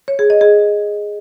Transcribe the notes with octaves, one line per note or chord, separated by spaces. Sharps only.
C#5
G#4
D#5
G#4